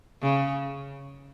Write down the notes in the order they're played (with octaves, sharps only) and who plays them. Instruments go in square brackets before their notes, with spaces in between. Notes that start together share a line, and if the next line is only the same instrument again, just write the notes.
[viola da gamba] C#3